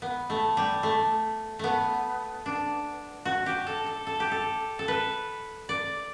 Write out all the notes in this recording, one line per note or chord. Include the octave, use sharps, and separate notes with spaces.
B3
A3
G3
A3
A3 B3
D4
F#4
G4
A4
A4
A4
G4
A4
A4
B4
D5